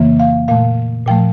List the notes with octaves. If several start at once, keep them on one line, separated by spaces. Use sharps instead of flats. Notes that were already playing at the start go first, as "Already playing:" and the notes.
Already playing: F2 C#3 E3 A#3
F5
A#2 A3 F5
A#2 F3 A3 G5